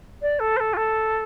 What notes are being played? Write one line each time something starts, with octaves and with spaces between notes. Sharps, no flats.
D5
A4
C5
A4
F4
A4